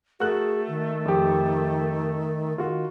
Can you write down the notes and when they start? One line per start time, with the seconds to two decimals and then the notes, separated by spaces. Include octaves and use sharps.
0.20 A3 F#4 G#4 A#4 F#6
0.68 D#3
1.05 F2 G4
2.58 D#3 F4 F#4